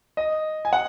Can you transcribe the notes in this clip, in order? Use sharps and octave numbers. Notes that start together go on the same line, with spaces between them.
D#5
G#5
F#5